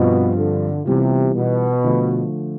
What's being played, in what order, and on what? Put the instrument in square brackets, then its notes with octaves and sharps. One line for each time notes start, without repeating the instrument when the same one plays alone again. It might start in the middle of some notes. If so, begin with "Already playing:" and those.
Already playing: [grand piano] G2 F3 C4 F4 [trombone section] B2
[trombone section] D3
[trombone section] C3 [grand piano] E3 G3 B3 F4
[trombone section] B2
[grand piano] D3 F3 A3